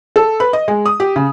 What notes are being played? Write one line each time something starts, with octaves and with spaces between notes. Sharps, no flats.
A4
B4
D#5
G#3
D#6
G4
C#3